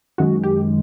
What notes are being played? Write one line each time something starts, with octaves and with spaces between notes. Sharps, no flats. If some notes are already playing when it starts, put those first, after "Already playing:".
F#2 D#3 G#3 F#4
G4